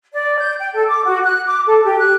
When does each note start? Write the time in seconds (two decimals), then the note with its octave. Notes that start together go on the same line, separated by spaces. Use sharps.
0.13 D5
0.39 G6
0.60 G5
0.74 A4
0.89 D6
1.05 F#4
1.24 F#6
1.45 D6
1.66 A4
1.84 G4
1.99 F#6